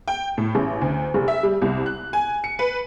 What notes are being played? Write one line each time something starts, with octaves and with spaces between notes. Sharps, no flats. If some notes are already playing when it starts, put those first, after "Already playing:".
G5
A2
A1
D2
F1
E5
G3
C2
F#6
G#5
C#7
B4